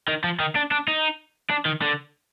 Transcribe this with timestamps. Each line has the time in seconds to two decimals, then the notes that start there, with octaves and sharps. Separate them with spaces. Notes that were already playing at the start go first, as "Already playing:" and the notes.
0.08 D#3
0.24 F3
0.40 D#3
0.56 D4
0.71 D4
0.88 D#4
1.50 D4
1.66 D#3
1.82 D3